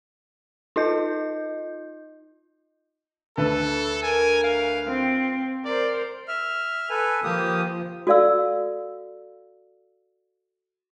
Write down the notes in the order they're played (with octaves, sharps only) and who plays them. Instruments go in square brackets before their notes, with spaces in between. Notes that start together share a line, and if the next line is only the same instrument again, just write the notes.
[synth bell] D#4 F4 D#5 G6
[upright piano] D2 B4 [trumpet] A4
[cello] A#4 [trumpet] G#5
[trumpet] F5
[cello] C4 [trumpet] F4
[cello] A#4 C5 [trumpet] D5
[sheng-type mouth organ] E5 F6
A4 B4 G#5
[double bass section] F3 [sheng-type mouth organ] A#3 G4 D#6
[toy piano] F#4 A4 D5 F5 E6